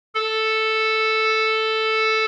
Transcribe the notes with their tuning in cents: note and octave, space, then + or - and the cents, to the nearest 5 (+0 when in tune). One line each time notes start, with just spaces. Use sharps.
A4 +0